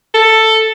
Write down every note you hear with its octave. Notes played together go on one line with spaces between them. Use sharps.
A4